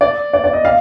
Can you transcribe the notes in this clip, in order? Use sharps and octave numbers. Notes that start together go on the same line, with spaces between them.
D5
D5
D5
D#5
F5